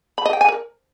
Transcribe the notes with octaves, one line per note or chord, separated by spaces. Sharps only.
B5
D#5
G5
G#5
A#4